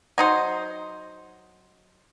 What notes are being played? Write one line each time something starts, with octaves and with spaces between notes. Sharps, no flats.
F#3 D#4 C5